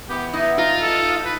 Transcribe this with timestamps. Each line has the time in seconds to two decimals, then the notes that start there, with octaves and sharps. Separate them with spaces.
0.09 E3 B3 G4
0.33 D#4 E4 D#5
0.58 D#4 F4 A#5
0.82 A4
1.25 B4